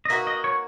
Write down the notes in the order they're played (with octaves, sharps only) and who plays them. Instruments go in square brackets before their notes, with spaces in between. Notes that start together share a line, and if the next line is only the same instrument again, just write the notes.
[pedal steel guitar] D#5
[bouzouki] A#3 D#4 F#4 B4 [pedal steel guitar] E5
[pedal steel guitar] D#5
C#5